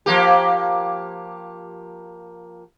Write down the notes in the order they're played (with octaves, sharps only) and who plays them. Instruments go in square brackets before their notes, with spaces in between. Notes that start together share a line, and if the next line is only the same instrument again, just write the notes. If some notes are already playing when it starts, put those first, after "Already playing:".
[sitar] F3 A#3 G4